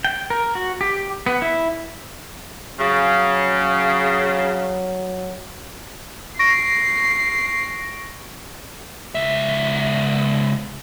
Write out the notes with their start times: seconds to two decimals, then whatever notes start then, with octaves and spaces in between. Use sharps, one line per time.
0.05 G5
0.30 A#4
0.55 F#4
0.81 G4
1.26 B3
1.42 E4
2.79 C#3 F#3
6.39 C#6 A#6 C7 D7
9.15 C#2 E5